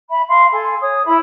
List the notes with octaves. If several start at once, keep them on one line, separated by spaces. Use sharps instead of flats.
E5 B5
F5 C6
A4 G#5
C#5 D#6
E4 E5 B5